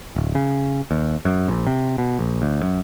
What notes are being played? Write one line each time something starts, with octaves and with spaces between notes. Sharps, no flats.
D1
C#3
D#2
F#2
A#1
C3
B2
A#1
D2
F#2